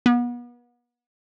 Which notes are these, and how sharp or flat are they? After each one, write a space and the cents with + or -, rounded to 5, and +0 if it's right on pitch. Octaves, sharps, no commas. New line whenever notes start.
B3 -35